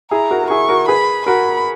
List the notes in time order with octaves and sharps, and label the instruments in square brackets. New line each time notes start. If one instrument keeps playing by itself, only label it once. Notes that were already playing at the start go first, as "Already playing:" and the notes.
[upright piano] E4 G#4 [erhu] A#5
[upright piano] F#4 A#4
A#4
[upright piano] E4 G#4 [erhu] C#6
[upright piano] F#4 A#4
[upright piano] G#4 B4 [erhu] B5
[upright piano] F#4 A#4 [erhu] B5